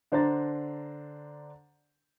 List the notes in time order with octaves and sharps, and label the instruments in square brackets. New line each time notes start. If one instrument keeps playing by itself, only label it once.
[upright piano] D3 D4 C5 D5 A#5 A6